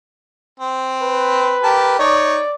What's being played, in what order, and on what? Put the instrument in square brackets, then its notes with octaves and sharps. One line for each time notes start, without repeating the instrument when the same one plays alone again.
[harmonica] C4
[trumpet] B4
[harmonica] G4 A#4 A5
[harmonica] D#4 C#5 [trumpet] D5